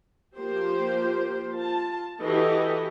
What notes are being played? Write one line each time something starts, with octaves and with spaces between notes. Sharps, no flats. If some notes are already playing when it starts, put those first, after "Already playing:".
F3 A#3 G4 C5
F4 A5
E3 F#4 G4 A4 D#5